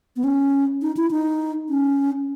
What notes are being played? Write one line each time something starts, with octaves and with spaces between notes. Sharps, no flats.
B3
C#4
D#4
E4
D#4
C#4